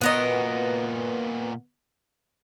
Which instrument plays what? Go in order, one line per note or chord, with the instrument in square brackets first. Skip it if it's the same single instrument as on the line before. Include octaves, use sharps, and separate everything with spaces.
[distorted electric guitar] A#2 F#4 [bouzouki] B3 A#4 D#5